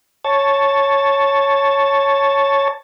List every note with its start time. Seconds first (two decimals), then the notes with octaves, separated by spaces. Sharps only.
0.25 C#5 A5